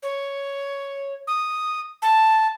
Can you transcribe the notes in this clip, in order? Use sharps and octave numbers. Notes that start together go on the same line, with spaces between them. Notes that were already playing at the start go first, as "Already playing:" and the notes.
C#5
D#6
A5